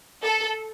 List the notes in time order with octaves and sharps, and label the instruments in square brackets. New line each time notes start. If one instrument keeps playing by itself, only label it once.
[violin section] A4